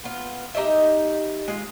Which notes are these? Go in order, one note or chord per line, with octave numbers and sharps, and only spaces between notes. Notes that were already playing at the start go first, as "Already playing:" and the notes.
B3 F4
D#4 G4 D#5 E5
G#3 F4